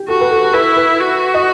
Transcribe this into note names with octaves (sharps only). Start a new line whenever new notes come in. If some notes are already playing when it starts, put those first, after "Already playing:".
Already playing: G4
F#4 A4
B4
A4
E4 B4
B4
F#4
D#5